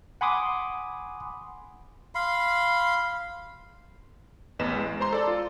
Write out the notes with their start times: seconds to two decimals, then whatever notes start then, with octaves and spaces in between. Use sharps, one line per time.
0.21 F#5 G#5 B5 C6 D6 D#6
2.15 F5 B5 C6
4.59 A1 E2 B4 D#5 E7
4.76 G#3
5.00 C5 A#5 C6
5.13 A4 D5
5.27 F4